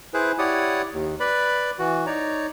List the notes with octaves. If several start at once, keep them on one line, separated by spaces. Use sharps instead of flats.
E4 G#4 B4 C5
E4 G4 C#5 D5 F#5 D#6
D#2
B4 D5 B5
E3 F#4
D#4 C#5 D5 A#5